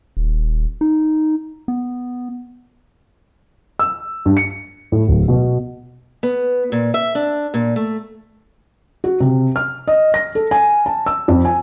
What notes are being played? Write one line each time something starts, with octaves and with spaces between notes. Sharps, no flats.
D#1
D#4
B3
E6
G2
C#7
A2
D1
B2
B3
A#2
E5
D4
A#2
A3
F#4
C3
F6
D#5
A#6
A4
G#5
A5
E6
F2
G#5